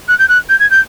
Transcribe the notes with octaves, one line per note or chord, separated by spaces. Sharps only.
F#6
G6
F#6
G6
G#6
G6